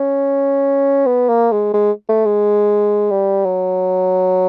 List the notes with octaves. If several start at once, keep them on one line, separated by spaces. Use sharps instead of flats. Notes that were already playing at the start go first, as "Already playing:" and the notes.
Already playing: C#4
B3
A#3
G#3
G#3
A3
G#3
G3
F#3